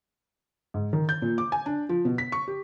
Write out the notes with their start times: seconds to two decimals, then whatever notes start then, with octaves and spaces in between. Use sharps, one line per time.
0.74 G#2
0.93 D#3
1.09 G6
1.22 A#2
1.38 D6
1.52 G#5
1.66 D4
1.89 F3
2.05 B2
2.18 B6
2.32 C#6
2.48 G4